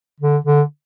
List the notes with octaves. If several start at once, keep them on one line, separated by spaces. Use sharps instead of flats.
D3
D3